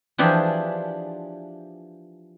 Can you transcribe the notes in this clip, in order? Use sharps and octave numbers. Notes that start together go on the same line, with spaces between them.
E3 F3 D4 G4 G#4 G#5